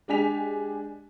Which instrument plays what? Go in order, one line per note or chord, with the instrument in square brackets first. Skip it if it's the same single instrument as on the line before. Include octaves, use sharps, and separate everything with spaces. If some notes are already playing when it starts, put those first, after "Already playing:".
[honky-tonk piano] G#3 D4 G4 G#5 B6 F7